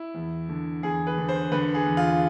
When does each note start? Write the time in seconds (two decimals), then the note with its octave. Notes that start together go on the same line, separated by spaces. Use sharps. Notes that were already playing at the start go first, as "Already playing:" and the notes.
Already playing: E4
0.14 E2
0.49 D3
0.83 E2 G#4
1.07 B4
1.18 D3
1.28 C5
1.52 D3 B4
1.74 G#4
1.86 E2
1.97 F4